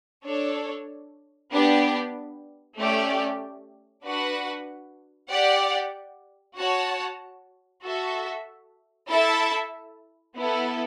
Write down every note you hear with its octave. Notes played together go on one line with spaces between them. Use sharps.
D4 A4 C#5
B3 D4 G4
A3 C#4 G4 D5
D4 F#4 B4 F#5
G4 D5 F#5
F#4 C#5 F#5 A5
F#4 A4 E5
E4 A4 E5 A5
B3 E4 A4